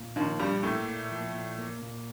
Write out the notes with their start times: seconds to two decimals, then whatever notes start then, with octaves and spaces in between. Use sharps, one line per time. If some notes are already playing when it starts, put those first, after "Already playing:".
Already playing: A#2
0.16 D#2 D#3 F3
0.39 G2 A#2 G3
0.63 A2 A3 A#3
0.87 A#2
1.11 F3
1.35 A#2
1.58 A#3
1.82 A#2